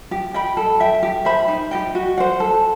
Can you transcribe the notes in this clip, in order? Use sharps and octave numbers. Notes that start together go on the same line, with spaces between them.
G4
D#5 G5 B5
A4
E5 G5
G4
C5 E5 B5
D#4
G4 D#5 G5
F#4
C5 F#5
A4